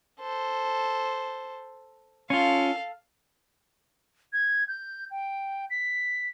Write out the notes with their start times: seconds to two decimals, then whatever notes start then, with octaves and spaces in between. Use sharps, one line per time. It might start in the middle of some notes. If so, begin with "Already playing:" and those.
0.20 A4 C5
2.30 C#4 F4 A4 F5
4.33 G#6
4.68 G6
5.11 G5
5.70 B6